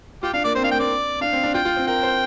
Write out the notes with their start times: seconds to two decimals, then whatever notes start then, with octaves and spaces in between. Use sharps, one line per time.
0.23 F4 G4
0.34 D4 F5
0.44 A#3 D5
0.55 C4 C5
0.63 D4 F5
0.72 A#3 G5
0.80 C4 D5
1.21 D4 F5
1.33 C4
1.43 D4
1.54 F4 G5
1.65 F4
1.76 C4
1.87 A#4 G5
2.03 C5